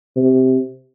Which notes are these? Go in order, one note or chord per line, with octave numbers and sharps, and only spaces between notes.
C3